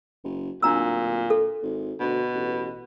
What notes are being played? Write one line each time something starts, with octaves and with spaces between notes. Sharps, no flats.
F#1
D1 A#2 D4 A#5 E6
A4
G#1
D2 B2
A1